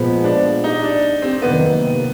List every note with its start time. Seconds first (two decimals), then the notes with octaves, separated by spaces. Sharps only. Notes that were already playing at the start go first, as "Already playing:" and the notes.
Already playing: A#2 F3 G#3 B3
0.24 D4
0.64 D#4
0.83 D4
1.22 C4
1.42 F2 C3 D#3 F#3 A#3 B3